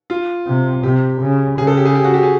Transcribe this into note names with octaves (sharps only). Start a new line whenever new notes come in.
F4
C3
C3 G4
C#3
C#3 G#4
A4
G4
G#4
G4
F#4
G4
G#4